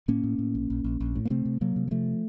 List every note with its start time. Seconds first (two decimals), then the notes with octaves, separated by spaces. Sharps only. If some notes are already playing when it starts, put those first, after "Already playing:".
0.08 A2 A#3 C#4
0.24 A2
0.39 A2
0.55 A#1
0.70 A#1
0.84 A#1
1.00 A#1
1.15 A2
1.25 A#3
1.30 C3 A3 C4
1.45 C3
1.61 C3 F#3 A#3
1.76 C3
1.88 F#3
1.91 C3 F3 A3